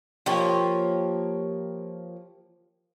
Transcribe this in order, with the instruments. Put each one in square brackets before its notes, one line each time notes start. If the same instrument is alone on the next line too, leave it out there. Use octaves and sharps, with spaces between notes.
[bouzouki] F3 A#3 G4 C#5